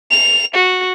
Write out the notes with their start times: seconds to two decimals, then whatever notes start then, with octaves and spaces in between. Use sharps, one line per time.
0.11 F7
0.55 F#4